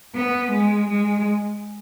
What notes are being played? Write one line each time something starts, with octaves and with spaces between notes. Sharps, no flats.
B3
G#3
G#3